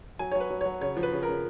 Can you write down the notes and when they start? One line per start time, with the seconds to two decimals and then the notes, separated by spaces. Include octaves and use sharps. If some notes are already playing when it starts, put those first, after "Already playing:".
0.19 F#3 G#5
0.32 C#5
0.35 F#3
0.40 B4
0.51 F#3
0.61 F#3 C#5
0.81 C#3 C#5
0.97 F3
1.03 B4
1.13 C#3
1.23 A#4
1.29 C#3